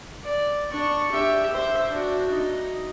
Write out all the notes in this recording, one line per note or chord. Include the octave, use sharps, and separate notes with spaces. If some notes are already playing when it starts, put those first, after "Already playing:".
D5
D4 C#6
G4 E5
C5 E5
D4 F#4
D#4